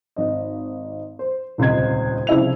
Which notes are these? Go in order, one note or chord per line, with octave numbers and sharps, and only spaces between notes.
G#1 D#5
C5
D#1 C#2 C3 C5 D#5 G#6
C2 C#3 F3 E4 G#4 F7